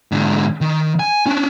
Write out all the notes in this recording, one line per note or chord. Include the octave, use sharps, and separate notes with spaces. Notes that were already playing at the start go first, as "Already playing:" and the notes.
G#2 D3
D#3
G#5
C#4 D4